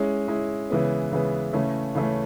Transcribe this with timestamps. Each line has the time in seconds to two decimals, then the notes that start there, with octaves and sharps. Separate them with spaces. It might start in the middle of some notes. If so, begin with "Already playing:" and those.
Already playing: G#3 C#4 E4
0.28 G#3 C#4 E4
0.70 C#3 E3 G#3 B3
1.12 C#3 E3 G#3 B3
1.53 C#3 E3 A3 C#4
1.95 C#3 E3 A3 C#4